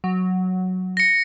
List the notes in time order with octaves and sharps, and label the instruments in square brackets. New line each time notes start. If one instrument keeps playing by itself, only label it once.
[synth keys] F#3
[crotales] A#6 C#7